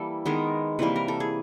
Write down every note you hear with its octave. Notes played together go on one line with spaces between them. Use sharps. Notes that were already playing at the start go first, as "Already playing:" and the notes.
Already playing: E3 G3 A#3 A4
D#3 G#3 B3 A#4
C3 E3 G3 A#3 B4
A#4
A4
G#4